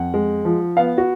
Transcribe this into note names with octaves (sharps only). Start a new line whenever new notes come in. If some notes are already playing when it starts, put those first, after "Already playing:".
Already playing: F2 F#5
G#3
F3
B3 F5
F#4